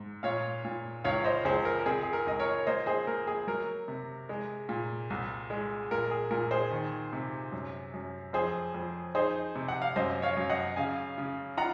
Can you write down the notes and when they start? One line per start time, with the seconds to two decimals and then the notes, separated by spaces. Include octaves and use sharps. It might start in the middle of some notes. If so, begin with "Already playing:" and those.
Already playing: G#2
0.23 A#2 C#5 F5
0.65 A#2
1.04 C#2 C#5 F5
1.24 C5 D#5
1.45 C#2 G#4 C5
1.65 A#4
1.79 A#4
1.86 C4 G#4
2.03 G#4
2.13 A#4
2.27 C#2 D#5
2.40 A#4 C#5
2.59 C#5
2.67 A#3 C5 D#5
2.86 G#4 C5
3.07 A#3 A#4
3.27 G#4
3.47 F#3 A#4
3.88 C3
4.29 G#3
4.69 A#2
5.10 C2
5.50 G#3
5.91 A#2 A#4
6.11 G#4
6.31 A#2 A#4
6.51 G#4 C5
6.71 D#3
7.13 C3
7.52 F#2
7.94 F#2
8.33 F2 G#4 C5
8.74 F2
9.15 D#4 G#4 C5
9.56 C3
9.68 F#5
9.82 F5
9.96 F#2 C5 D#5
10.22 C#5 F5
10.37 F#2
10.50 D#5 F#5
10.76 C#3 F5 G#5
11.18 C#3
11.57 F4 F#5 A#5